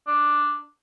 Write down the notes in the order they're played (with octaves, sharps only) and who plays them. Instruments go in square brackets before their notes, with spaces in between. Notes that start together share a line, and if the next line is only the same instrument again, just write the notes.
[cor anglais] D4